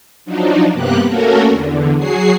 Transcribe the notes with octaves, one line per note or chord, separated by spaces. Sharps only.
F3 F#3 D4 D#4
G2 C3 A#3 B3 G4 F#6
A3 A#3 C#4 F#4 A4 A#4
E2 D3
F#3 F#4 G#4 C7